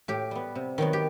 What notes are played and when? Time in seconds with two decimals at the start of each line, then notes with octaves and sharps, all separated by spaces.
0.08 A2 G4
0.31 G3 B3
0.55 C3
0.78 D#3 F#3 B3
0.93 G4